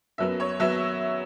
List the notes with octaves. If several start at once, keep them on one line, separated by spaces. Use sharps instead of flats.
F#2 F#3 B3 E5
C#5
F#3 B3 E5